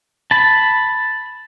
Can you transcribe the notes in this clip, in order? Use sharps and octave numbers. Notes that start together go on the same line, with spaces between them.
A5 B5